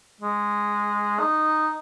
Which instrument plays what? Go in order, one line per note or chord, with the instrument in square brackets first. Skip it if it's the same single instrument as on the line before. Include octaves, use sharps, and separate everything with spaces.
[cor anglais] G#3
D#4